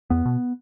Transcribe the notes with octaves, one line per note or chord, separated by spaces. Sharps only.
E2 B3
B2